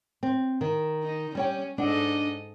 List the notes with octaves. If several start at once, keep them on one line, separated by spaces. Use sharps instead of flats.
C4
D#3
D#4
G3 C#4 C#5 G5
G#2 D4 A4 D#5 F#5